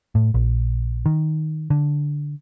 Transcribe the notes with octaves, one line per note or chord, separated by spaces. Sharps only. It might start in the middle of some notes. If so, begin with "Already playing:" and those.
A2
A#1
D#3
D3